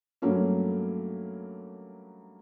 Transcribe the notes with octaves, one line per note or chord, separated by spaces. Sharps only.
G2 F#3 A3 A#3 C#4